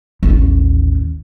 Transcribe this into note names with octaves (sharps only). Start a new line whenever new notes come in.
A1 D#2